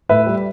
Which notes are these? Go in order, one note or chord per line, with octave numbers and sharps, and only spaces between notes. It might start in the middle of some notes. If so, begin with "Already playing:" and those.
A2 B4 E5
G3